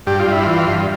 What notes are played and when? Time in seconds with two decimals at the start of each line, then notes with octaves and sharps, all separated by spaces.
0.07 G2 G4
0.20 F4
0.27 G2 E4
0.43 E3 F4
0.67 G2